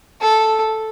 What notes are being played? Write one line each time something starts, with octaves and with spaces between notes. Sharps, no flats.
A4